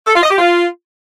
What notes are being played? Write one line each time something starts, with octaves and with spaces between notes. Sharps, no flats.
A4
F4
D#5
G4
F4